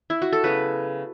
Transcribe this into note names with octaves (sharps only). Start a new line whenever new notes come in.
E4
F#4
A4
C#3 F#3 B3 B4